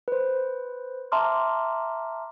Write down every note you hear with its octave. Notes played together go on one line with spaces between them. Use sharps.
B4 C5
E5 A5 A#5 C6 D6 F6